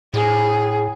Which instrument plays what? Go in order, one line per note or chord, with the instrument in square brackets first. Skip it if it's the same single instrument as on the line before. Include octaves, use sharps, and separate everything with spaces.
[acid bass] A2 [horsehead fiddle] G#4